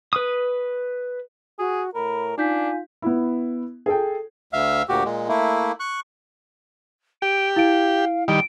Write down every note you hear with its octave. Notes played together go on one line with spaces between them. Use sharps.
B4 D#6
F#4 G#4
A2 A#4 B5
D4 D#4 F4 G#5 G6 B6
B3 E4
G#4 A4 G5
D2 E5 F5
D2 A#2 F#4 G4
A#2 G#3
A3 A#3 E4
C#6 F#6
G4 D7
E4 F5 D7
D#3 G3 D7